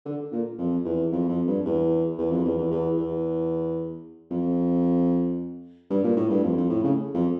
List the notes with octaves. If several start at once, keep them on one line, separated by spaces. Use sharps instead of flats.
D3
A#2
F2
E2
F2
F2
G2
E2
E2
F2
E2
E2
E2
E2
F2
G2
A#2
A2
G2
F2
F2
A2
C#3
F2